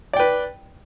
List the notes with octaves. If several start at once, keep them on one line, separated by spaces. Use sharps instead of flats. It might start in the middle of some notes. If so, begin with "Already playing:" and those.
B4 D5 G5